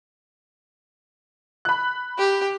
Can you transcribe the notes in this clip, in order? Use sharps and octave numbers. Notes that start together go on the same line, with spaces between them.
B5 F#6
G4